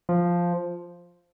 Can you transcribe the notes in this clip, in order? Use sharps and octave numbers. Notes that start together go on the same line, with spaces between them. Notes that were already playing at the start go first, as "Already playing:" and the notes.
F3